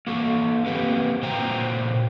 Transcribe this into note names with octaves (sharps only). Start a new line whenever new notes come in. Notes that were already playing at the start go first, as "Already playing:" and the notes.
A#3 F#4 A4
A#3 C4 G4 B4 F#5
A#2 F#4 C5 G5 A#5